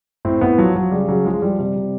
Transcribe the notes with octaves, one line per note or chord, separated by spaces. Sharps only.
A2 C4
A2 B3
F3 F#3
F3 F#3
C#3 G3
C#3 F#3
F3 G#3
F3 G3
C3 G3
C3